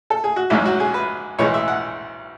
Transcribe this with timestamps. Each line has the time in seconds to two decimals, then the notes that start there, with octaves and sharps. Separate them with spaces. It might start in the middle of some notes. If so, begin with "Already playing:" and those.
0.10 A4
0.24 G#4
0.36 F#4
0.50 A1 G#2 F#3 E4
0.65 F#4
0.80 G#4
0.94 B4
1.38 B1 A2 E3 G#3 C#5
1.54 E5
1.68 F#5